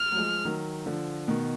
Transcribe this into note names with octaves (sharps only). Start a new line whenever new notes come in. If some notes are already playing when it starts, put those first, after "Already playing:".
Already playing: F6
F#3
F3 G#3
D#3 F#3
D3 F3
B2 D#3